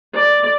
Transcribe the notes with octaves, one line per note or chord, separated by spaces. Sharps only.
D5